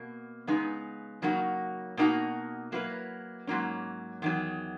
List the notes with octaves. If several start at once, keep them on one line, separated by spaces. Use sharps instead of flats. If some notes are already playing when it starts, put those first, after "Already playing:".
Already playing: B2 A#3
C#3 G#3 B3 D#4
C#3 F#3 A#3 D#4 F#4
B2 A#3 D#4 F#4
F#3 A#3 E4 B4
G#2 F#3 A#3 C#4
E2 D#3 F#3